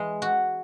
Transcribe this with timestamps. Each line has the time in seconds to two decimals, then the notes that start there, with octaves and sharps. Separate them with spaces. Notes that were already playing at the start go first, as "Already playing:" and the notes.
Already playing: E3 G#3
0.22 F#4